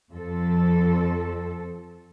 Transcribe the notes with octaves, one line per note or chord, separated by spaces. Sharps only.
F2 F3 A4